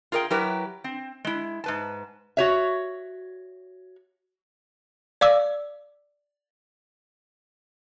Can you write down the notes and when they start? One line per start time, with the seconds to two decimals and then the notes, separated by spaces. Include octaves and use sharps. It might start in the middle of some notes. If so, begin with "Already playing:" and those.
0.12 F4 G#4 A#4 D5 G5
0.30 F#3 E4 G4 A#4 B4
0.84 C4
1.25 G#3 E4
1.64 G#2 B4 A5
2.37 F#4 C#5 E5
5.21 D5 F5 D6 E6